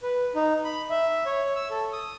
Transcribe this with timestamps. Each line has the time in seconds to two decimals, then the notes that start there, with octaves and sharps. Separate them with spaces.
0.03 B4
0.35 D#4
0.64 B5
0.90 E5
1.26 C#5
1.56 E6
1.70 A4
1.93 D#6